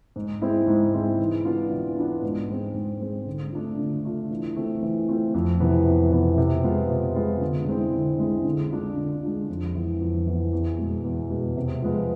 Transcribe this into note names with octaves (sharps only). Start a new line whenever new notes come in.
G#2
G#3 C4 E4
G#2
G#3 C4 E4
E3
B3 D4 F4
E3
B3 D4 F4
G#2
G#3 C4
G#2
G#3 C4
D3
A3 D4 F4
D3
A3 D4 F4
E3
A3 C4 F4
E3
A3 C4 F4
F2
C3 E3 B3
F2
C3 E3 B3
C3
G#3 B3 F4
C3
G#3 B3 F4
D3
G#3 C4 E4
D3
G#3 C4 E4
D3
G#3 D4 F4
D3
G#3 D4 F4
F2
E3 B3
F2
E3 B3
E2
B2 G#3
E2
B2 G#3
C3
F3 G#3 B3 F4